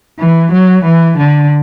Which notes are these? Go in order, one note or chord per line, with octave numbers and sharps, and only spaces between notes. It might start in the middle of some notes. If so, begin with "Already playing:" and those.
E3
F#3
E3
D3